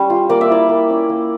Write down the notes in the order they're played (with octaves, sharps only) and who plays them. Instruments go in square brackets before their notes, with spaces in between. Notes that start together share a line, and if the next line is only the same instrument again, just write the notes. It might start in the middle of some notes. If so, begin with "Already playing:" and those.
Already playing: [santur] G3 C#4
F4
A#3 D5
E5
E4 D5
A#3
C#4
A#3